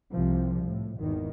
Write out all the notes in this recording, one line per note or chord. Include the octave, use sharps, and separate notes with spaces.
C2 C3 F3
A2
G#1 E2 D#3